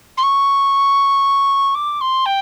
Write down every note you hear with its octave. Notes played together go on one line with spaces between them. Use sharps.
C6
C#6
D6
C6
G5